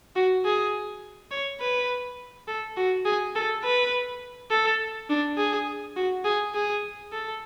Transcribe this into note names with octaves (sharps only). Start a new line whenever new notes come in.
F#4
G#4
C#5
B4
A4
F#4
G#4
A4
B4
A4
D4
G#4
F#4
G#4
G#4
A4